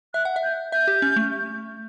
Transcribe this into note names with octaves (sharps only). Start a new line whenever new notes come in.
E5 F#6
F#5
E5
G6
E5 G6
G4
C#4
A3